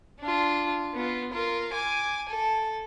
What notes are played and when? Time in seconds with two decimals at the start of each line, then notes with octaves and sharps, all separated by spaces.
0.20 D4 F4
0.94 B3 F4
1.32 F4 A#4
1.73 G#5 D6
2.29 A4